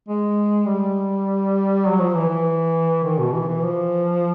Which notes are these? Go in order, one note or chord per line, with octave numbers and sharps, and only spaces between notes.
G#3
G3
F#3
F3
E3
E3
D#3
B2
E3
E3
F3